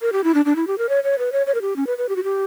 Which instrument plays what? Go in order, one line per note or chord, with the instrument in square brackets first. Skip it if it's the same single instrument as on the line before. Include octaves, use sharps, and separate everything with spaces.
[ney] A#4
G4
E4
D4
D4
E4
G4
A#4
C#5
C#5
B4
C#5
C#5
A#4
G4
C#4
B4
B4
G4
F#4
G4